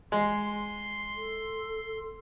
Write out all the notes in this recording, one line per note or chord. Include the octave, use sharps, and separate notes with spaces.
G#3 C6
A4